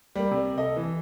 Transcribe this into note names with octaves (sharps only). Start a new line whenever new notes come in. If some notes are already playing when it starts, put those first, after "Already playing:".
G3 A#3
C3
A4 D#5
E3